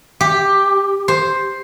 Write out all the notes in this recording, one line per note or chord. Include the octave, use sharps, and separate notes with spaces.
G4
C5